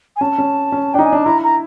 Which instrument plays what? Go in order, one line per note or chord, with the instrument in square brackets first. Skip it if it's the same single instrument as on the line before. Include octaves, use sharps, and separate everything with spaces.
[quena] G#5
[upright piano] C#4 [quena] A5
[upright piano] C#4
C#4
[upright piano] D4 [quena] G5
[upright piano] D#4
[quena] G#5
[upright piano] D4 [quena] A5
[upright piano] E4 [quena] A#5
[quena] A#5